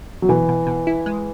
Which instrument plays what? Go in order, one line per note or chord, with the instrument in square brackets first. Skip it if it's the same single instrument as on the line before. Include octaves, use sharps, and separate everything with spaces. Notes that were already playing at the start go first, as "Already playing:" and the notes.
[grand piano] F#3
[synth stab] B2 [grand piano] E3
[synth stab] B2
B2
E4
G#3